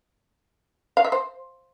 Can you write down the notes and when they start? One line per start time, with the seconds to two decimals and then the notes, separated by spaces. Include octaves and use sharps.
0.97 F5
1.04 E5
1.12 C5